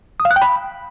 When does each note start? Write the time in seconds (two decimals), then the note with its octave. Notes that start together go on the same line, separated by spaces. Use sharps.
0.20 D#6
0.25 F5
0.31 F#6
0.36 G5
0.42 B5